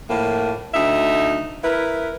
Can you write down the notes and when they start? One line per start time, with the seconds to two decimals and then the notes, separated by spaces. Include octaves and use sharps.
0.10 A2 F3 A#3
0.74 D2 D#4 E5
1.63 E4 A#4 B4